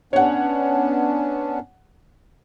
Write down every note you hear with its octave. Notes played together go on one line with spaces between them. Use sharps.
B3 C#4 D4 C#5 F#5